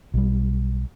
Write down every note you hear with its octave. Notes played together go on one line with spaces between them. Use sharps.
B1 G3